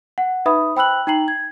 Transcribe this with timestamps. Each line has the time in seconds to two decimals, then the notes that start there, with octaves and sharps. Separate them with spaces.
0.18 F#5
0.46 D#4 B4 E5 B5 D#6
0.76 C5 G5 B5 E6 F#6 F#7
1.07 D#4 G5 A#5 C7 F#7
1.28 G#6